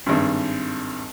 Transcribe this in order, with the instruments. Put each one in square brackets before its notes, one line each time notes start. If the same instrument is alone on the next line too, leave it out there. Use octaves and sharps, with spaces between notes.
[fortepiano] G#1 G2